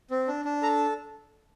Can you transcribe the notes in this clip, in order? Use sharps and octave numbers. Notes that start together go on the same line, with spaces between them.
C4
D4
D4
A4 A#5